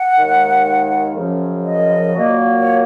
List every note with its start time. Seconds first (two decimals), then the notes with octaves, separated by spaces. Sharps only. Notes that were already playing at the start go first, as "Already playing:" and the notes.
Already playing: F#5
0.18 D#2 D#3 G#3
1.15 F#2 C#3 F3
1.64 D#5
2.13 A#2 F#3 A#3
2.61 C#5